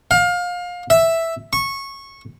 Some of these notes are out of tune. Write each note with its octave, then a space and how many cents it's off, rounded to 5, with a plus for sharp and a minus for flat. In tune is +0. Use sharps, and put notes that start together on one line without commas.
F5 +25
E5 +0
C#6 -15